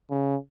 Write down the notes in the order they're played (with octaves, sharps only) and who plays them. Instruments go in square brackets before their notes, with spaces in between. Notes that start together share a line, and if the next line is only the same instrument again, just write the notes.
[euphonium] C#3